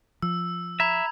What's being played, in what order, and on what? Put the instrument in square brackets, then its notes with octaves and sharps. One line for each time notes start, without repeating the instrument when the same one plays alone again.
[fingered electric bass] F3 [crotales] E6
[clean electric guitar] E5 [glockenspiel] A#5 B5 G#6